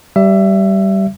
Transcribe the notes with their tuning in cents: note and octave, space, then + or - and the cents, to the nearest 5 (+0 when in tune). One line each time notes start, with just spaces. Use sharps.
G3 -15 E5 +20